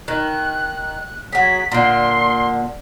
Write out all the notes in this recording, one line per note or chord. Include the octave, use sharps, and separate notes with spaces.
D#3 F#6
F#3 G#4 B6
A#2 D3 C6